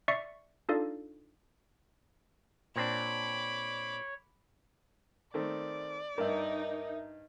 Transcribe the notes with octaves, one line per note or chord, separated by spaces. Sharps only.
D5 E5 C#6 C7 C#7
D4 D#4 F4 A4 D5 F5
A#2 C4 D4 C#5 B5 D6
D#3 A3 C4 D5
G2 D#4 A#4 E5